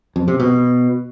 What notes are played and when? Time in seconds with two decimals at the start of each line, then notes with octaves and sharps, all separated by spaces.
0.16 F2
0.28 C3
0.40 B2